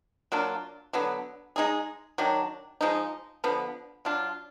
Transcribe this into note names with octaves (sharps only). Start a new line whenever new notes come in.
F#3 A#3 D4 F4
D3 F#3 B3
G#3 D#4 G#4
D#3 F#3 D4
F3 G#3 D#4
D3 F3 B3
F#3 D4 F4